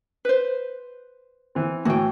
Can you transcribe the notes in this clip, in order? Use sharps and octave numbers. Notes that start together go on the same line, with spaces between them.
B4 C5
E3 C4
A2 E3 F#4 G5